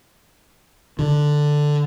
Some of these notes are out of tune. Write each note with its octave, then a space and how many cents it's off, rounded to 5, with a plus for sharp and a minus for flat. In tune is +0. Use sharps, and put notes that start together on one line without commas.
D3 +5